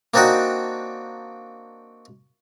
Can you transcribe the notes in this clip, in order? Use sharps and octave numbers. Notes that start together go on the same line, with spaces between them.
A#3 C4 D4 D#4 F#4 G5